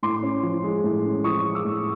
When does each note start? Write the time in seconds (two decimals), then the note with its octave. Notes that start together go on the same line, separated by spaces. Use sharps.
0.03 A2 C6 D6
0.23 C#4
0.43 F3
0.64 G#3
0.84 A2
1.05 C#4
1.24 F3 C#6 D#6
1.45 G#3
1.55 D6 E6
1.65 A2